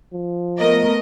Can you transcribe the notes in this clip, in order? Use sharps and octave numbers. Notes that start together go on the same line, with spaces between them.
F3
A3 B3 A#4 D#5